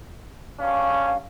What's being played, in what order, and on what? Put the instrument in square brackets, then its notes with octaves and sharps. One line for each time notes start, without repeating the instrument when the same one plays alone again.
[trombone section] G2 C#4 [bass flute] F5